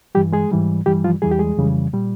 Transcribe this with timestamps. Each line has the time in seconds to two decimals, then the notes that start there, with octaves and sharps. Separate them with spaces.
0.15 G2 E3 G3 G4
0.33 G#3 G#4
0.52 G#2 E3 G3
0.86 G2 E3 G3 G4
1.04 F3 F4
1.22 E2 E3 G3 G#4
1.31 G4
1.39 G#3 G#4
1.57 F2 C#3 E3 G3
1.93 A#2 G3